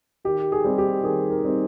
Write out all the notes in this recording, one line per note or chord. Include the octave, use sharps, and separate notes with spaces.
D#3 G4
G#4
G3 C4 D#4
G4
D#3 G#4
A#4
G3 C4 D#4